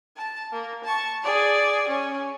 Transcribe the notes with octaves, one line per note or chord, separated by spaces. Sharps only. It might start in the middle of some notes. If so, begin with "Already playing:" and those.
A5
A#3
A5 C#6
G#4 D5
C#4